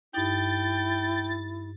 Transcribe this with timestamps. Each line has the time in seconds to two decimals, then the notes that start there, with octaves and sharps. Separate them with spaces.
0.14 G2 D#4 E4 G5 A6